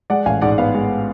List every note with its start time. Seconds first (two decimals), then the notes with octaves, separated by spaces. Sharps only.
0.10 G#3 D5 F#5
0.26 A1 F5 G#5
0.41 G#2 D5 F#5
0.58 B3 F5
0.74 G#3